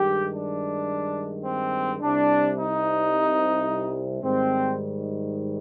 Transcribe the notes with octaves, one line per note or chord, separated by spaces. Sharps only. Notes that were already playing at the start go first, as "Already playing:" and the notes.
Already playing: G2 D#3 G#3 G4
D4
C4
C2 C3 G3 D4
D#4
G#2 D#3 G3 C4